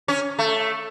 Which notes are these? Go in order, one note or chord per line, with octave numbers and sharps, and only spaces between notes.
C#4
A3